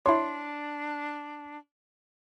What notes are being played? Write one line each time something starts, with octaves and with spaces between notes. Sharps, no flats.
D4 E4 C#5 C6